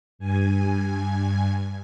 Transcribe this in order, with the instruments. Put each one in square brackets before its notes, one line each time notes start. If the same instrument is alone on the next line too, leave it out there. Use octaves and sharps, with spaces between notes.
[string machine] G2 G#5